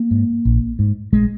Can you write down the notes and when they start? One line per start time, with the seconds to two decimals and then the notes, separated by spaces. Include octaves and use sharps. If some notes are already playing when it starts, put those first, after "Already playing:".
Already playing: A#3
0.11 G#2
0.45 A#1
0.79 G#2
1.12 A#1 G#3